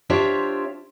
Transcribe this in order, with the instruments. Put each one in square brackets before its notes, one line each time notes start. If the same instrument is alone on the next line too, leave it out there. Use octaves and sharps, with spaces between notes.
[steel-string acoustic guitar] D4 F4 G4 C5 C#5 E5